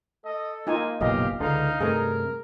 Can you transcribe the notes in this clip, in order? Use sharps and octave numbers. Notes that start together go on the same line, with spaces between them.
A4 D#5
A#3 D#4 F4 G#5
F#1 B1 A#2 G4 D#5 F5
C#2 D3 D#4 F5
G2 C3 A3 G#4 A#4